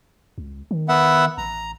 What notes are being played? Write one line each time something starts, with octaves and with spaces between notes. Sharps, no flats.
C#2
D#3
B3 E5 F#5
A1 A#5